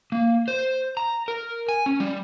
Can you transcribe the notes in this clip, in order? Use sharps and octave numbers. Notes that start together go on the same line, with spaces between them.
A#3
C5
A#5
A#4
G#5
C#4
G3